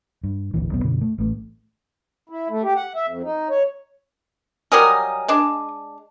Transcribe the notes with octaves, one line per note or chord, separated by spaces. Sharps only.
G2
G#1 D2 A#2 E3
D#1 B1 B3
F#2 B2 D3
A3
A1 A3
E4
A3
G4
F#5
E5
F2
D#4
C#5
F#3 G3 A#4 D#5 G#5 D#6
G#3 D4